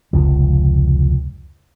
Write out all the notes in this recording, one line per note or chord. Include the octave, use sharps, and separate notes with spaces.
F1 C#2 F3